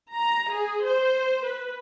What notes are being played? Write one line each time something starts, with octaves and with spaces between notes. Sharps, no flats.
A#5
G#4
C5
B4